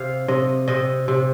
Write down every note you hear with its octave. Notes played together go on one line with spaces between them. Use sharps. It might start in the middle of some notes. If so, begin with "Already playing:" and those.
Already playing: C3 F5
C3 D#5
C3 D#5
C3